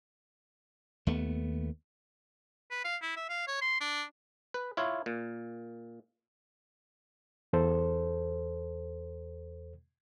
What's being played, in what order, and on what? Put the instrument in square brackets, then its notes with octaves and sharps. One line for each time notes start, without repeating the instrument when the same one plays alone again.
[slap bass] D#2 A3 B3
[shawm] B4
F5
E4
E5
F5
C#5
C6
D4
[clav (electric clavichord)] B4
E4 F4 C#5
A#2
[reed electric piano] E2 A4 C5